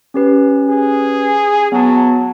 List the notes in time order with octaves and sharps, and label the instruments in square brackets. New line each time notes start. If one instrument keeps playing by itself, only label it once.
[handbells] C#4 G4 B4
[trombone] G#4
[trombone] F#3 [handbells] B3 A5